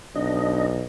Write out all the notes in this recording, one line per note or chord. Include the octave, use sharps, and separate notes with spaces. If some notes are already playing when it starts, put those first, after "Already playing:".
B1 D4 D#5